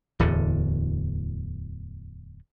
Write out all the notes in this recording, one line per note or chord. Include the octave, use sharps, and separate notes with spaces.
D1 E2 D3